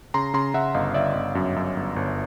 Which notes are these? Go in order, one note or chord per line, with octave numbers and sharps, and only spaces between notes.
C#3 A#5 C6
C#3 A#5 C6
C#3 E5 F#5
G1 D#5 F5
G1 D5 E5
G1
F#2
F#2
G1
G1